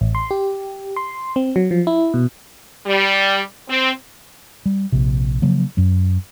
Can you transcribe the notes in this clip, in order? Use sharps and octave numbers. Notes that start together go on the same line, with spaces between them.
A1
C6
G4
C6
C4
F#3
F3
E4
B2
G3
C4
G3
A#1 C3
C#3 F3 F#3 A#3
F#2 F#3